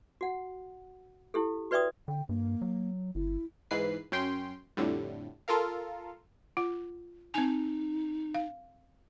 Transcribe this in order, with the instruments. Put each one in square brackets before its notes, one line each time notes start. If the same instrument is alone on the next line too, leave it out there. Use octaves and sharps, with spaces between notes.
[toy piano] F#4 F#5
E4 G4 A4
F#4 B4 D5 E5 G5 D#6
[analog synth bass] D3 [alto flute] G5
[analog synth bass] G2 [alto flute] A#3
[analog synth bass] F#3
[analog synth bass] G1 [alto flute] E4
[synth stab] G#2 E3 B4 C7
F#2 C#4 G5 C6
F2 A2 D3 G3
F4 A4 A#4 F5
[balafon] F4 F#5
[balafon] C4 G#5 [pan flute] D#4
[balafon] F5